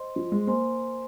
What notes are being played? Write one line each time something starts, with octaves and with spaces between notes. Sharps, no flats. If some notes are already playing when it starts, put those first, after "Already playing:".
Already playing: C5 D#5 C6
F3
G#3
A#3 C5 G#5 C6